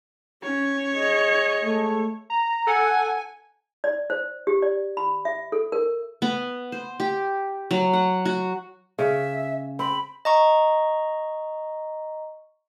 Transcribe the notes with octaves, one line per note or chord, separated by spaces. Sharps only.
C#4 C#5
G#4 D#5
G#3 A3
A#5
A4 F#5 G#5
D5
C5
G4
D5
B5
E5
A4
A#4
B3
C5
G4
F#3
F#5
F#4
C#3 E5
C4 B5
D#5 A#5 C#6